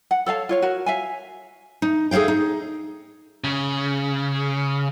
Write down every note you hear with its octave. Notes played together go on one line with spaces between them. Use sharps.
F#5
A4 C#5 F5 A5
F4 C#5 F5
F#4 A#4
E5 F5 G#5
D#4
G#4 A4 C#5 F5 G5
D#4
C#3